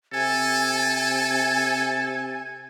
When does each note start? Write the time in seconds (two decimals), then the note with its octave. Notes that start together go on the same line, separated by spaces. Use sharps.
0.13 C3 A4 G#5 G#6